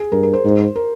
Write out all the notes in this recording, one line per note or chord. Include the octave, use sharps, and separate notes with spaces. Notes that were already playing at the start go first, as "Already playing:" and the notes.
Already playing: G#4
G2 A#4
A#4
C5
G#2
A#4